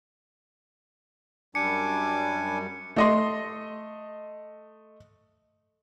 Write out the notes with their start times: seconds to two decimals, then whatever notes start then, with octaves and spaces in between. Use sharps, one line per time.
1.55 F#2 G3 D4 G#5 D6 C#7
2.96 A3 D#5 C6